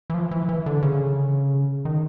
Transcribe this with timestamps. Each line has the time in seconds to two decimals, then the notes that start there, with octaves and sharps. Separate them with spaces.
0.10 E3
0.14 F3
0.31 E3
0.49 E3
0.66 D3
0.82 C#3
1.85 D#3